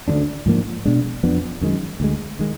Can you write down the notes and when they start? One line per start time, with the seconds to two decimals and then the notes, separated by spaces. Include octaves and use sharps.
0.08 D2 D3 F#3 D4
0.46 G#2 F3 A#3 D4
0.85 B2 G#3 D4
1.23 F2 F3 B3 D4
1.61 F#2 D#3 G#3
2.00 D2 D3 G#3
2.39 D#3 G#3